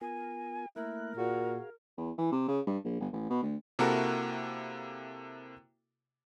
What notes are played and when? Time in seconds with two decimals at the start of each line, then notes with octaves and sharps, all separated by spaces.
0.01 B3 F4 A#4 G#5
0.76 A3 A#3 E4 A#4 F#6
1.17 A#2 F#4 G#4 F5
1.98 E2
2.18 E3
2.32 C3
2.48 C#3
2.67 G2
2.85 A#1
3.00 G1
3.13 A1
3.30 B2
3.43 D2
3.79 C3 A#3 E4 F#4 A4 A#4